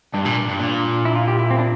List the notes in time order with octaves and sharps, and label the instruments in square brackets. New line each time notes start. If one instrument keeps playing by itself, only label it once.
[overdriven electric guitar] G2 [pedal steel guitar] D4
[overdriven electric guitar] A#2
G2
A#2
[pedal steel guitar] E4
F4
G4
E4
C4
D4